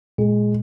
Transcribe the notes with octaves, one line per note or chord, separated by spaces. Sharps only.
A#2 G#3